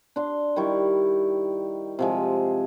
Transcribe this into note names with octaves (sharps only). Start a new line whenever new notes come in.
D4 C6
D#3 G3 E4 C#6
C3 F3 G#3